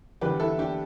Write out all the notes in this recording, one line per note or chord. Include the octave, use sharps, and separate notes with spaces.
E2 D3 G3 G4 B4
E4 A4
D4 G4